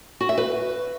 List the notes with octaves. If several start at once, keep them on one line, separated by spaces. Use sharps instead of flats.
F#4
E5
B4